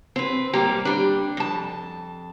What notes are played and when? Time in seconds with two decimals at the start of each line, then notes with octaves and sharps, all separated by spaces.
0.16 C4 B4
0.53 G3 A#3 G4
0.85 G3 D4
1.37 F2 A5